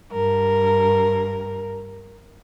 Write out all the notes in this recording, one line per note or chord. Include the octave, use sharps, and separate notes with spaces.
G2 A#4